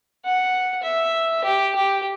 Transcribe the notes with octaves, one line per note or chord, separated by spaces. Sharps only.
F#5
E5
G4
G4